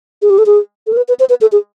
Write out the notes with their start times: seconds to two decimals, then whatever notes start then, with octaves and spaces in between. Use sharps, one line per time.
0.22 G#4
0.30 G4
0.38 A4
0.46 G#4
0.87 A4
0.93 A#4
0.97 B4
1.08 B4
1.20 C5
1.29 B4
1.41 A4
1.52 G#4